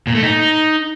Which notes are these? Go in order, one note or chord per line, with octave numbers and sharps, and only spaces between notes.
A#2
A3
D#4